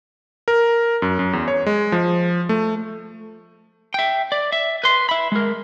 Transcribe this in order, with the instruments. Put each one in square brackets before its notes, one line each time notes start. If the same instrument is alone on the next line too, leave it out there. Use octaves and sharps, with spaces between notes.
[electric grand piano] A#4
F#2
F#2
E2
C#5
G#3
F3
A3
[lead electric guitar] E5 G5
D5
E5
B4 C6
E5 B5
G#3 A#4